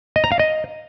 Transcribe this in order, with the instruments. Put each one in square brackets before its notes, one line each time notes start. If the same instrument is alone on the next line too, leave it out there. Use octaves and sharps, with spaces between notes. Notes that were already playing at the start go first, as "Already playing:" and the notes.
[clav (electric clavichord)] D#5
A#5
F5
D#5